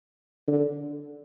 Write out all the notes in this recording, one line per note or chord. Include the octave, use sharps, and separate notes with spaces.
D3